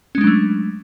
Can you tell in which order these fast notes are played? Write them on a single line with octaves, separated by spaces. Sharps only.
C#4 G#3 D4 F#3 A3